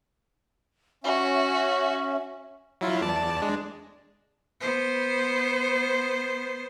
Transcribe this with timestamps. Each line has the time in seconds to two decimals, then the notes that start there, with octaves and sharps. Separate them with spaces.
1.04 C#4 F#4 E5
2.81 F#3 E4 F4
3.01 E2 D5 A5
3.42 G#3 D4
4.61 B3 C5